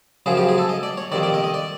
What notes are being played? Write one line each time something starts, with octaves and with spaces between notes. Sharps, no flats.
F#2 C#3 F3 G#4
G4
G#4
A4
D#5
D5
C#5
F2 C3 D#3 D5
D5
D#5
D#5
D5